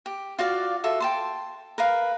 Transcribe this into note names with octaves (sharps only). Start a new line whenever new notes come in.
G4
F4 F#4 D5 F5
F4 F#4 A4 E5
G5 A5 C6
A#4 B4 F5